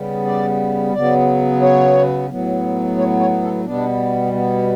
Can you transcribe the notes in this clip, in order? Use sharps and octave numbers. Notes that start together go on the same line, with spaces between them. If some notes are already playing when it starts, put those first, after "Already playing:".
Already playing: C#3 G3 B3
D5
C#3 F#3 B3 D5
C#5
A2 F#3 B3
C#5
C#5
A4
B2 G3 B3 D4
B3